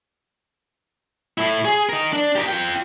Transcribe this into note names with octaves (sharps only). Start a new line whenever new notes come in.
A2 E4
G#4
D#4 A#4
D4
G4 A#4
F4 G5